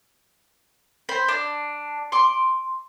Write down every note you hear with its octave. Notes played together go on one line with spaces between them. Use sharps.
C5 B5
D4
C6 D6